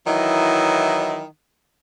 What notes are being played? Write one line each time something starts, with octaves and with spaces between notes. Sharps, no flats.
D#3 E3 F#3 E4 D#5